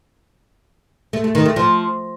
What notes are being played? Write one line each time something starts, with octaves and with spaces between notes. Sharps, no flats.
A3
A3
D#3
A3
F3